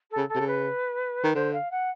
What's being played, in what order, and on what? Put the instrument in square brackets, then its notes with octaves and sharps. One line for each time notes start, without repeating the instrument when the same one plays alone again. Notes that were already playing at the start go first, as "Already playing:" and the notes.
[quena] A4
[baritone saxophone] C#3
[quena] A4
[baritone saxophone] C3
C#3
[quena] B4
[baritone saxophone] D#3
[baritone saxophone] D3 [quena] C5
[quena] F5
F#5